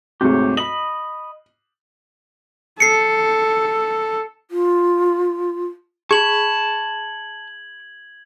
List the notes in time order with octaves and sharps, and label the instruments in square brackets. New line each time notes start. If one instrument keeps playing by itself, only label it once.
[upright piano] D2 G#2 C3 [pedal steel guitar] G4 C#5
[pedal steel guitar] D#5 B5 [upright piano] F#7
[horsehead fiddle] A4 [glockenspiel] C7 C#7
[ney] F4
[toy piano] G#4 [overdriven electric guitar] A5 [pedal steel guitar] B5 C#6 [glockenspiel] G#6 F#7